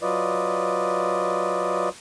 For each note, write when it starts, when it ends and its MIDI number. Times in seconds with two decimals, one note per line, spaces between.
0.02 1.89 54
0.02 1.89 65
0.02 1.89 71
0.02 1.89 74
0.02 1.89 75